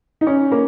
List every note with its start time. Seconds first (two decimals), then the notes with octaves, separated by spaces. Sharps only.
0.21 D#4
0.27 C#4
0.52 A#3